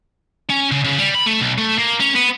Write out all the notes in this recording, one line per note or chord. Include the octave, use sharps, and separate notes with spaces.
C#4
C#3
C#3
G3
B5
A3
B1
A3
A#3
C#4
B3